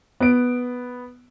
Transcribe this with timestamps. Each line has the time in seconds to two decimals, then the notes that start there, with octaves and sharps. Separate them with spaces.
0.20 B3 D7